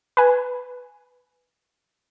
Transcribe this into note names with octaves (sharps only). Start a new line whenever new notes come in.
B4 G#5